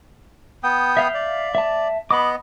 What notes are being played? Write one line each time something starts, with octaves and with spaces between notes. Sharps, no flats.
B3 G5 D#6
E5 F5 G6
D5
E5 A5
B3 D#5 B5 D6